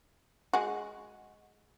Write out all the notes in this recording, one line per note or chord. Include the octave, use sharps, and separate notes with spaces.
G#3 F#4